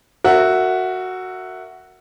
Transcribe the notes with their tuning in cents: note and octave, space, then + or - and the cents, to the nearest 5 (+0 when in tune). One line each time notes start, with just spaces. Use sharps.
F#4 +0 A#4 -30 E5 +0